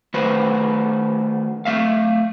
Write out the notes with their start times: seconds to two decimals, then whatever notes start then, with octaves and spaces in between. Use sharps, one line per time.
0.14 D#3 A3 F#4 B4 C5
1.65 A3 E5 F5